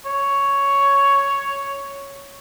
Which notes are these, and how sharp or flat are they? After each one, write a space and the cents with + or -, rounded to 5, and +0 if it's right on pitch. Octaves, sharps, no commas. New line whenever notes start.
C#5 +5